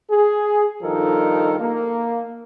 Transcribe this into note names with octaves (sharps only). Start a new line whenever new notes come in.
G#4
G2 D#3 F3 D#4 A4 A#4
A#3